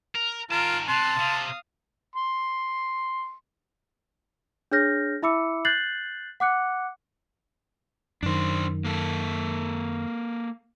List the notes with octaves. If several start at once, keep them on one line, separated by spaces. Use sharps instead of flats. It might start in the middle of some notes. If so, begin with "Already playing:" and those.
A#4
D#3 F4 A#4 A5 D7
C3 A5 C6 F#6 C7
C3 F5 D#6
C6
D4 G#4 C#5 F6 G6 A#6
E4 E5 B5 D6 E6 C#7
F#6 G6 A6 C7 F#7
F#5 D6 F#6 C#7
F#2 D#3 D4 C5
A#3 A4